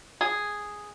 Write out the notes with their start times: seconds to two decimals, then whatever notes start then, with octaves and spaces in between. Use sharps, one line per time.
0.21 G#4